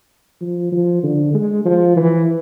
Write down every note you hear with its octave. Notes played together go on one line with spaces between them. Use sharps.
F3
F3
D3
G#3
F3
E3